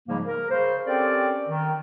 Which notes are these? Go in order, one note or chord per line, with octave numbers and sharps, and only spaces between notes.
G#2 C#3 F3 G3 G#3 A#3
A#4
C#3 C5
C4 C#4 G4 A4 A#4 D5
D#3